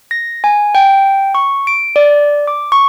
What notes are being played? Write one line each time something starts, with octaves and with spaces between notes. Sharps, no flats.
A#6
G#5
G5
C#6
D7
D5
D6
C#6